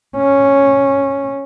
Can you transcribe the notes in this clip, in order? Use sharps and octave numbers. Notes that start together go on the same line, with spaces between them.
C#4